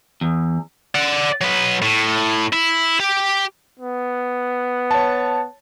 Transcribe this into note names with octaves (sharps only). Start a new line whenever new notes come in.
E2
D5 F#5
F#3 B4
A2
E4
G4
B3
C#5 A5